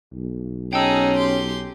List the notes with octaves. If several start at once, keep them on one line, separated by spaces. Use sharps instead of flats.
B1
C#4 D#4 G#4 G5 A5 E6
G4 C6